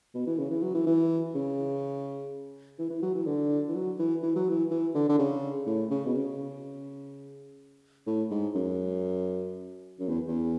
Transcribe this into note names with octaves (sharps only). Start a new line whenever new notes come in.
B2
E3
C#3
E3
F#3
E3
E3
C#3
E3
E3
F#3
E3
D3
E3
F#3
E3
E3
F#3
E3
E3
D3
D3
C#3
A2
C#3
B2
C#3
A2
G#2
F#2
F#2
E2
E2